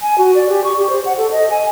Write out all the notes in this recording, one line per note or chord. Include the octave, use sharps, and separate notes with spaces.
G#5
F#4
D5
G4
C#6
G4
C5
F#5
A4
D#5
G#5